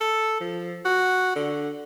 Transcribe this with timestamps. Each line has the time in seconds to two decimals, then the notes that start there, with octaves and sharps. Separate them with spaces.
0.01 A4
0.41 F3
0.85 F#4
1.36 D3